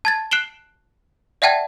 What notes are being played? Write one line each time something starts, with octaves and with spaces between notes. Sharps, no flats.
A5 G#6 A6
F#6 C7 D7 E7 F#7 G7
D5 E5 F#5 G5 A5 G#6